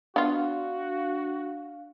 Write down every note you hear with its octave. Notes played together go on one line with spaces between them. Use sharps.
B3 D4 F4 F#4 F5